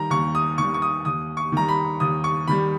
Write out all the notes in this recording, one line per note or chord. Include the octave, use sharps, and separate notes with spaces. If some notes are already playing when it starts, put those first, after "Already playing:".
Already playing: D#3 G3 A#5
D#2 C#6
D#6
D#3 G3 C#6
C#6
D#6
D#2 D#6
C#6
D#3 G3 A#5
B5
D#2 D#6
C#6
D#3 G3 B5